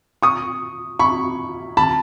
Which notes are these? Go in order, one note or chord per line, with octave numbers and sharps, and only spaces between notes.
C#6 D#6
B5 C#6
A5 B5